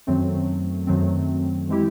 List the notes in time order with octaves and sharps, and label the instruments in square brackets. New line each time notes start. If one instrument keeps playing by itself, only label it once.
[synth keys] F#2 D#3 F#3 A3 C4
F#2 D#3 F#3 A3 C4
E3 G#3 C4 E4 G4